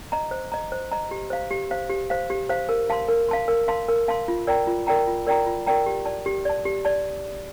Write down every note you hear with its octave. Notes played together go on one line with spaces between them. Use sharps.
D#5 A#5
C5
D#5 A#5
C5
D#5 A#5
G4
C5 F5
G4
C5 F5
G4
C5 F5
G4
C5 F5
A#4
F5 A5 C6
A#4
F5 A5 C6
A#4
F5 A5 C6
A#4
F5 A5 C6
F4
A#4 D5 G5 A#5
F4
A#4 D5 G5 A#5
F4
A#4 D5 G5 A#5
F4
A#4 D5 G5 A#5
G4
D5 A5
G4
D5 A5
G4
D5 A5